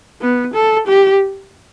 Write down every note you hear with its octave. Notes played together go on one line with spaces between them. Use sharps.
B3
A4
G4